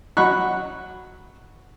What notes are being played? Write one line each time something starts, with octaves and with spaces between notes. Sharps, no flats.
F#3 F#5 B5 C#6 F#6